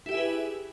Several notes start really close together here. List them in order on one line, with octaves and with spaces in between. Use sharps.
E4 G4 E5 G#4 B4